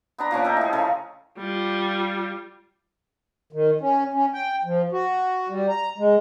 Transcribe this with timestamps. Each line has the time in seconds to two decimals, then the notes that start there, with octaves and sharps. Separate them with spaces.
0.18 B3 D4 A#5
0.31 A#2 F3 C#4 D6
0.44 A4 A#4 D#5 G5
0.57 A2 G#4
0.73 C#3 F3 A4 A#4
1.38 G3 F4
3.53 D#3
3.81 C#4
4.14 C#4
4.34 G5
4.65 F3
4.92 F#4
5.49 G3
5.69 A#5
5.98 G#3